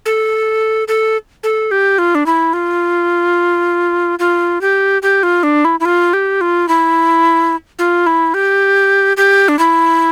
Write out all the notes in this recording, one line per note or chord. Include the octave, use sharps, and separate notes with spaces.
A4
A4
A4
G4
F4
D4
E4
F4
F4
G4
G4
F4
D4
E4
E4
F4
G4
F4
E4
F4
E4
G4
G4
D4
E4